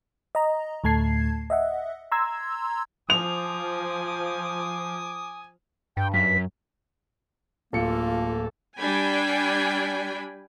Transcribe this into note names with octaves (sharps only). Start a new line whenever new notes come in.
D#5 A#5
D2 A2 A3 A5 G#6 C7
D#5 E5 F#5
A#5 C6 E6 G#6
F3 G#5 D6 D#6 F7
G2 G5
F#2 B6
D1 A#3 F4 A4 C#7
G3 D4 G5 G#5 B5